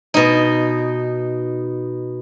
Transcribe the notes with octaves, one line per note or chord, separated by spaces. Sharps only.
B2 D#4